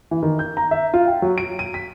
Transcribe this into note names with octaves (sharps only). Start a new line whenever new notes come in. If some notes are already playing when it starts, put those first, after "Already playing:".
E3
D#3
G6
A#5
E5
F4
G5
F#3
D7
D#7
B6